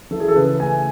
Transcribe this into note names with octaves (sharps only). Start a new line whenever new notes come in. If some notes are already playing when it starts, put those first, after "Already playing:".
E3 A4
G#4
A4
C#3 B4
A3 G#5